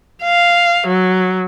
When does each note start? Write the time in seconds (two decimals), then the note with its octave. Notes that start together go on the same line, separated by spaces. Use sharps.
0.23 F5
0.87 F#3